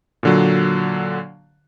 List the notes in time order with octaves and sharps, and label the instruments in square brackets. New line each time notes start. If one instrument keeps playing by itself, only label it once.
[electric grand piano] A#2 D3 F#3